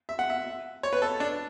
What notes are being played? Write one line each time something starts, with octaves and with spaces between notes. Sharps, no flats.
E5
F#5
E5
C#5
B4
A4
D4